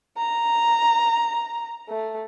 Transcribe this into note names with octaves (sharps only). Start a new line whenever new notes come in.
A#5
A3